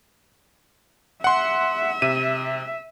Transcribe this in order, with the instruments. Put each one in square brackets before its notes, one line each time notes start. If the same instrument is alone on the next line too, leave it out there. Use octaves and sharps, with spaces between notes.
[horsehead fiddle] E5 [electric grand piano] F#5 C6
[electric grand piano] C3 D#7